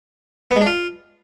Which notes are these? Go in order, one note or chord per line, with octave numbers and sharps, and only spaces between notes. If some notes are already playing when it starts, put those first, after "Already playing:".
B3
G#3
D4
F4